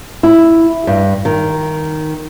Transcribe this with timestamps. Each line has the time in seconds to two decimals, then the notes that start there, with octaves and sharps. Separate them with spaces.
0.23 E4
0.87 G2
1.25 D#3